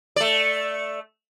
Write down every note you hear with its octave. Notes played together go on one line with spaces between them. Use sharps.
A3 D5